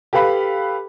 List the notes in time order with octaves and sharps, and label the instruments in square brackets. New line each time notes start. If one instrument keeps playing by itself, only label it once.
[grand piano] G4 A4 B4 F5 B5